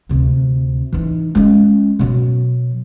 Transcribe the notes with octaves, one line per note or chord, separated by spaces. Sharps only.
D2 C3
E3 D#4
G#3 C#4
B2 F#3